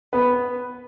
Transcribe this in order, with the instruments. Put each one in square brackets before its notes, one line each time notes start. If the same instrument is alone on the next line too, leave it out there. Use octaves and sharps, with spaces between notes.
[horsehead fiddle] B3 [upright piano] B4